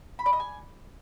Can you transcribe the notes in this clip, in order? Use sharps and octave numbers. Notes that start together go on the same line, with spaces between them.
B5
D5
D#5
G#5